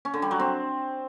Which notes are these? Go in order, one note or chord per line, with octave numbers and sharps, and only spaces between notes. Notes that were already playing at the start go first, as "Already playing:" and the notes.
C#4
D3
G3
F#3
C4